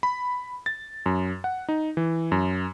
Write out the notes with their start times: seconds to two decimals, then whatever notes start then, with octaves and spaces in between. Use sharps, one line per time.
0.03 B5
0.66 A6
1.06 F#2
1.44 F#5
1.69 D#4
1.97 E3
2.32 F#2